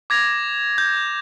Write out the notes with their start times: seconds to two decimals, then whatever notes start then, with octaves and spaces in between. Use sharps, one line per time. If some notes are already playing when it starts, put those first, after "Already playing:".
0.10 D6 G#6 A#6 F7
0.78 G6